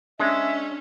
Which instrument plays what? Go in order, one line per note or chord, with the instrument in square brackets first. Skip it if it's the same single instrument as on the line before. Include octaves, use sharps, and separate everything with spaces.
[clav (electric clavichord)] G#3 [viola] C#4 [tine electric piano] D4 [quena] E5